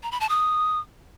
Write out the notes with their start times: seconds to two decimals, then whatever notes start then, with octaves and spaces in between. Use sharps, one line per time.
0.03 A#5
0.12 B5
0.21 A5
0.29 D#6